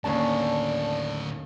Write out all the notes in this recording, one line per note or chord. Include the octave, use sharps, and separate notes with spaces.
D#2 A2 D3 C#4 D4 A5